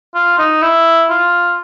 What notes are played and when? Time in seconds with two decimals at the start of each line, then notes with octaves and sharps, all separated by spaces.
0.15 F4
0.38 D#4
0.62 E4
1.10 F4